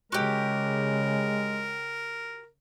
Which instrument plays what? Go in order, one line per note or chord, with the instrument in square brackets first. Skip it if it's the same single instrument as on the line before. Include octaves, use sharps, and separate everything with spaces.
[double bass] C#3 [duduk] G#3 [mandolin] F#4 G4 [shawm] A#4